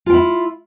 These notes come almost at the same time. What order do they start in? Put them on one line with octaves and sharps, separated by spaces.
F4 G5 E4